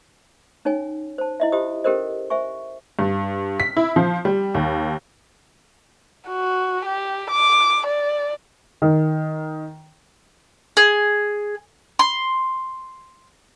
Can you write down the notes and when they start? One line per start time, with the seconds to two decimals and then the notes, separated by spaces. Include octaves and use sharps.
0.65 C#4 D#4 C#5 G#5
1.18 C5 A5
1.40 E4 D#5 E5
1.52 F4 G4 C5 D#5 D#6
1.84 C#4 G4 A4 A#4 C5 D#5
2.30 C5 E5 G#5 C#6
2.99 G2
3.60 B6
3.77 E4
3.96 F3
4.25 G3
4.54 D#2
6.29 F#4
6.86 G4
7.31 D6
7.87 D5
8.82 D#3
10.77 G#4
11.99 C6